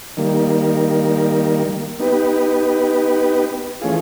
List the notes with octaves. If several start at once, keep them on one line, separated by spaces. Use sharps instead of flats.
D#3 G3 A#3
B3 D#4 G4 B4
E3 A3 C#4 F4 G#4